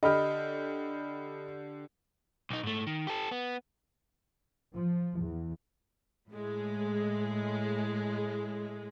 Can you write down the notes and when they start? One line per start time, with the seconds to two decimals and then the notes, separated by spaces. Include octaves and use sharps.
0.03 D3 G4 D#5 B5 F6
2.50 B1 D#4
2.63 G#2 A3
2.87 D#3
3.07 G4 A4
3.31 B3
4.74 F3
5.18 E2
6.31 A2 G#3